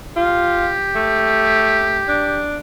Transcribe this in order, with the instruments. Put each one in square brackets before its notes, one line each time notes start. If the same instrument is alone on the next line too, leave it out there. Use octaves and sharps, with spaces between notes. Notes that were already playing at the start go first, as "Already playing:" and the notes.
[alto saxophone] F4 [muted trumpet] G4
[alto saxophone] A3
D4